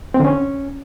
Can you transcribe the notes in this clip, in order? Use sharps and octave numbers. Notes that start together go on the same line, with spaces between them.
C4
D3
C#4